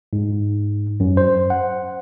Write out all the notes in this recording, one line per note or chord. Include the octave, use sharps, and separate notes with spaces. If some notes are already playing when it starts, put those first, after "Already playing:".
G#2
F#2
C5
F#5